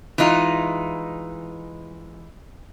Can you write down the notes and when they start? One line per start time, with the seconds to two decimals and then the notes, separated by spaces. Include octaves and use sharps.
0.18 E3 G#3 D#4 F4